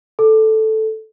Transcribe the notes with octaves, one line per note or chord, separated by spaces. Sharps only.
A4